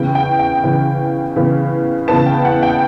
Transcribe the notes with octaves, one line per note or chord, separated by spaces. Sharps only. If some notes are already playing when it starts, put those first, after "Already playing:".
Already playing: C#3 E3 B3 G5
G5
G5
C#3 E3 B3
C#3 E3 B3
C#3 E3 B3 A5
G5
F#5
G5